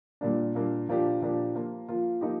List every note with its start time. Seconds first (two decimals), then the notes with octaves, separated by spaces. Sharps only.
0.21 A#2 G3 A#3 D4
0.55 A#2 G3 A#3 D4
0.89 A#2 F3 A#3 D4 G4
1.22 A#2 F3 A#3 D4 G4
1.55 F3 A#3 F4
1.89 F3 A#3 F4
2.21 F3 A#3 D#4 G4